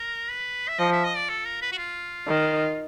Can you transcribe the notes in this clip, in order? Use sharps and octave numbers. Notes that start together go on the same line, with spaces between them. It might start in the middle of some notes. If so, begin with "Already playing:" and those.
Already playing: A#4
B4
E5
F3 D#5
E5
D#5
D5
A4
A#4
B4
F#4
F4
D#3